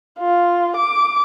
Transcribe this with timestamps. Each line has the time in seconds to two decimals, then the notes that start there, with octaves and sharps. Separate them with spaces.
0.19 F4
0.77 D6